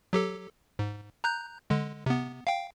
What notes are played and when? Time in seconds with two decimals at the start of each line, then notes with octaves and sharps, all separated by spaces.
0.13 F#3 G4 A4
0.79 G#2
1.24 A#5 F#6 G6
1.70 D3 G#3
2.06 C3 B3
2.47 F5 G5